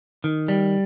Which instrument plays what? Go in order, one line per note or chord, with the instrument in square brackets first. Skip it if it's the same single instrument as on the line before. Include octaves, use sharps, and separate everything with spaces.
[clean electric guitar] D#3
G3